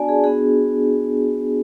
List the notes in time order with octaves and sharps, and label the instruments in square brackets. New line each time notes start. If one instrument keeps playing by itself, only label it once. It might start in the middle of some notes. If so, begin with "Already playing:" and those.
Already playing: [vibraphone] B3 D4 F#4 D5 G#5 A5
G#4
B3 D4 F#4 G#4